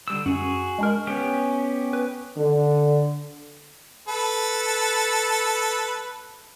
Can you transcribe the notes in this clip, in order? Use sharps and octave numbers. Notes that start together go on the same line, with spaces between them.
D3 G3 E6
F#2 F#4 G#4
G#3 D4 A#4
B3 C#4 G4
B4
D3
A4 B4